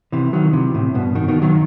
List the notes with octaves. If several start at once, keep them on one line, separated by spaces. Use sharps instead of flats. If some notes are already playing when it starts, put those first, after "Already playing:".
C3 E3
D#3 F#3
C3 E3
A2 C3
G2 B2
B2 D#3
B2 D#3
D#3 F#3